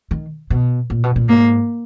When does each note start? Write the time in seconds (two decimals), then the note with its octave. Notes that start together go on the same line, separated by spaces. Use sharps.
0.11 D#3
0.50 B2
0.90 A#2
1.04 B2
1.16 A#2
1.29 G#2 A#3